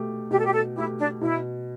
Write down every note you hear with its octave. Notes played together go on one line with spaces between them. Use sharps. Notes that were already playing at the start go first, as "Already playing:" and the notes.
Already playing: B2 A3 G4
B2 G4
A4
G4
A4
A3 E4 G4
D4
B2 E4